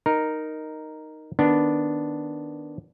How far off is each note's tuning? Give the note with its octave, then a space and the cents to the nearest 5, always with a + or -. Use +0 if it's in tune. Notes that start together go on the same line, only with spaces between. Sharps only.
D#4 -5 A#4 +0
D#3 +0 B3 +0 D4 +0